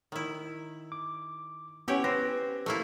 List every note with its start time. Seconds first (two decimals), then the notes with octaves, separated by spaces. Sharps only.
0.12 D#3 E4
0.92 D6
1.88 B3 C#4 E4 G4 C#5
2.04 C4 B4 A#6
2.66 A3 A#3 E4